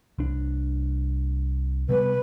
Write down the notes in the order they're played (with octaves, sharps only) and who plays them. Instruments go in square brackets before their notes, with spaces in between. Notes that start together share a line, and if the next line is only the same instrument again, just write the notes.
[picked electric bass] C2 D4
[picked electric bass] C3 G3 B3 [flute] B4